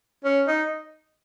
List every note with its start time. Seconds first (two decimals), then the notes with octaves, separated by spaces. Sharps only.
0.25 C#4
0.47 D#4